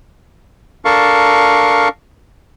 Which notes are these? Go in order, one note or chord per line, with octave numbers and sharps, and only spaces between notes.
D4 A4 A#4 F5 C#6